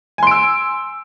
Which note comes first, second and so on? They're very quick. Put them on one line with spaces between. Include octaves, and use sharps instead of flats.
G#5 C6 D7 E6